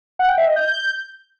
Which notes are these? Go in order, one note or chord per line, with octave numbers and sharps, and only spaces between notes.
F#5
G5
E5
D#5
G6